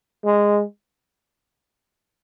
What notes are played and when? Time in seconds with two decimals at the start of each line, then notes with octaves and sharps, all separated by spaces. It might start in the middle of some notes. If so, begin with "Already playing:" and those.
0.24 G#3